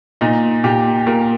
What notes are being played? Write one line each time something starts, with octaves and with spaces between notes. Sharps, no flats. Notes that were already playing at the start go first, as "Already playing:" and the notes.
A#2 D#4
A#2 G4
A#2 A#4